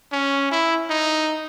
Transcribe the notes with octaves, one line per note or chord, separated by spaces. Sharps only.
C#4
E4
D#4